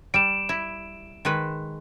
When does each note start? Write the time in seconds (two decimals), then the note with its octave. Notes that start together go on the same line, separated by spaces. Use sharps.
0.14 G3 D7 E7
0.49 E4
1.25 D#3 G#3 B4